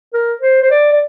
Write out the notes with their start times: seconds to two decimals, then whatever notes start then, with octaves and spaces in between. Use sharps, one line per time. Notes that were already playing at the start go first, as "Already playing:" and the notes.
0.14 A#4
0.42 C5
0.63 C5
0.71 D5
0.93 D5